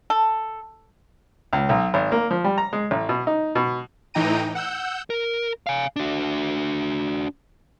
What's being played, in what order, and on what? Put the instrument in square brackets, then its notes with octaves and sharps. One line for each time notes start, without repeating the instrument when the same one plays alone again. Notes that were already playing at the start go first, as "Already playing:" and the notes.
[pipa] A4
[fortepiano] C#2
B1
G#1
A#3
F3
G3
A#5
G#3
A1
B2
D#4
B2
[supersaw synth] A2 E3 D#4 G5 A#5 D#7
F#5 E6 G6
[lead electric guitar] A#4
F5 G#5
D4 F#4